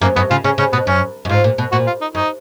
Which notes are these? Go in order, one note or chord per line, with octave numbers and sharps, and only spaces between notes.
F#2 A#3
F#2 B3
C#3 F4
C#3 C#4
C#3 C#4
B2 B3
F#2 C#4
F#2
G#2 F4
A#2
B2
A#2 F#4
F4
D#4
F#2 D#4